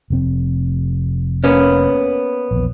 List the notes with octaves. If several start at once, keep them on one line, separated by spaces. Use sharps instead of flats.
F1 C3 C4
A#3 B3 C#4
A#1 E2